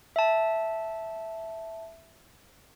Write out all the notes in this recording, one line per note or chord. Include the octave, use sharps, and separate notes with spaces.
E5 A5